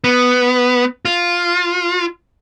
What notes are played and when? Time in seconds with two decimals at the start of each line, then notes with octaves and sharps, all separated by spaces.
0.04 B3
1.05 F4